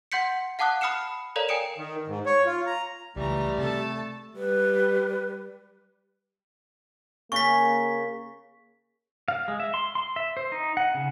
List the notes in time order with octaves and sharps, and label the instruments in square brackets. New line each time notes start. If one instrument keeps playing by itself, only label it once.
[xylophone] F#5 C6 G6 B6 C#7
F5 F#5 A5 D6 D#6 F#6
B5 D#6 F6 C7 C#7 E7
A4 A#4 C#5 D5 F5 A#5
G5 G#5 D#6 C#7 D7 E7
[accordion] D#3
G#2
C#5
F4
A#5
[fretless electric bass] C#2 [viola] E3 A#5 [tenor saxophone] G3 [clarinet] A3
[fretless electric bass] C3 [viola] A4 A5
[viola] G3 [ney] B4
[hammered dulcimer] C#3 [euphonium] A#3 [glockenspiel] C#6 B6
[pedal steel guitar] F5
G#3
E5
C6
C6
E5
C5
D#4
F#5
C#3